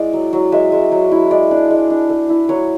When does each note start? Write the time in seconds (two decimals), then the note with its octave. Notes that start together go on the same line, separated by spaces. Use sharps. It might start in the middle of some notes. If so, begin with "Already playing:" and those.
Already playing: G#3 E4 D5
0.13 F#3
0.33 F#3
0.52 G#3 E5
0.72 G#3
0.92 F#3
1.11 E4
1.30 G#3 D5
1.51 D4
1.70 G#3
1.90 D4
2.09 A3
2.29 E4
2.49 F#3 C#5